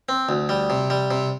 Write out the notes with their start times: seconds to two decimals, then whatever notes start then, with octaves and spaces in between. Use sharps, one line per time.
0.09 C4
0.29 D2
0.49 G3
0.70 C3
0.90 G3
1.11 C3